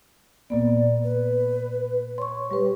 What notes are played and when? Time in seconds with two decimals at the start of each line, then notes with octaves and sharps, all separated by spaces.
0.50 A#2 A#3 B3 D5
1.04 B4
2.18 C#5 C6 C#6
2.51 G3 G4 B4